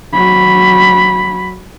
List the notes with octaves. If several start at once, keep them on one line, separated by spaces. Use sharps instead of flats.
F#3 B5